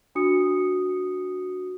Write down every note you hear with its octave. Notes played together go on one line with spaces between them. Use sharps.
D4 F#4 D#6 C#7